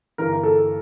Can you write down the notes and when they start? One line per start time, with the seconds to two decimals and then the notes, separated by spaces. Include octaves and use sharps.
0.18 G1 G2 E3 A#4
0.43 A4